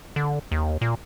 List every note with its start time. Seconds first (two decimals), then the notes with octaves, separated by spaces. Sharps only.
0.16 D3
0.52 D#2
0.81 A#2